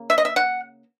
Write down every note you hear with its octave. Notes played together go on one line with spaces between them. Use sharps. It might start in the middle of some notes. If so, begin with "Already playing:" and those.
Already playing: C#3 A#3
E5
D#5
E5
F#5